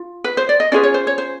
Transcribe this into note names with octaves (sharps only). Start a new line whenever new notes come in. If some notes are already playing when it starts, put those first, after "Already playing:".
Already playing: F4
B4
C5
D5
D#5
C#4 F4 G#4 B4 D5
C#5
C5
C#5
C5